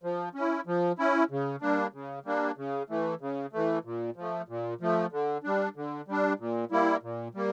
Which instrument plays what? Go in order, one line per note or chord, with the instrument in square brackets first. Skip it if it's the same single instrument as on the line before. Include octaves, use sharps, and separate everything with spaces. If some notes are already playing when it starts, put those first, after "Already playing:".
[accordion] F3
C#4
E4
F3
C#4 E4
C#3
G3 A#3 D4
C#3
G3 A#3 D4
C#3
E3 A3
C#3
E3 A3
A#2
F3 A3
A#2
F3 A3
D3
G3 D4
D3
G3 D4
A#2
G3 A#3 E4
A#2
G3 A#3